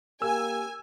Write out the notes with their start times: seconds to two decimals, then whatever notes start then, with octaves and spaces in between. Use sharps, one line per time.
0.22 A#3 G4 G#5 E6